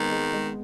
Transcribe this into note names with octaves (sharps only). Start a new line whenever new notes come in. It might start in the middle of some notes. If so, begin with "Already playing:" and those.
Already playing: D#3 G#3 B3 C4
G#3
G#3